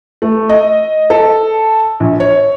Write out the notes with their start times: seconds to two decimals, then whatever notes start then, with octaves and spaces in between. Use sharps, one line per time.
0.22 A3
0.49 D#5
1.10 A4
2.00 A#1
2.20 C#5